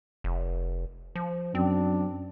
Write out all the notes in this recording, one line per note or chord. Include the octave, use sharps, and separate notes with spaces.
F1
F3
F#2 C4 D4